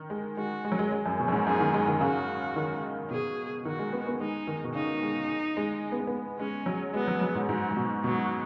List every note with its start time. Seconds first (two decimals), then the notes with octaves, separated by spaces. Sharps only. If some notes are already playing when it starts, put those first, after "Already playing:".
Already playing: D#3
0.10 G#3
0.37 G#3 F#4
0.65 G#3
0.72 F#3
0.79 G#3
0.92 G#3
1.06 F#2
1.20 B2
1.28 F#2
1.32 G#2
1.46 F#2 G#4
1.60 D#3
1.74 G#3
1.88 D#3
2.01 C#3 F#4
2.56 D#3
3.11 B2 G#4
3.65 D#3 F#4
3.79 G#3
3.93 B3
4.07 B3
4.20 G#3 D#4
4.47 D#3
4.64 B2
4.75 C#3 D#4
5.02 G#3
5.57 G#3
5.92 B3
6.00 G#3
6.07 B3
6.39 G#3 C#4
6.66 F#3
6.94 G#3 B3
7.08 F#3
7.21 F#3
7.35 G#2
7.48 G#2 F#3
7.71 G#2
7.77 B2
8.04 B2 F#3